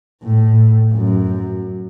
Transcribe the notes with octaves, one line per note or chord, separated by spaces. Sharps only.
A2
F#2